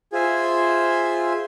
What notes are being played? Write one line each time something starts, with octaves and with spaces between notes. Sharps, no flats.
F4 G#4 C5 E5 G#5